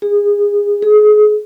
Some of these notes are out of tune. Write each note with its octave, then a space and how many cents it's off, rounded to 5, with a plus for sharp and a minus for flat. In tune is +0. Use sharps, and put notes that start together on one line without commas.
G#4 -25
G#4 +30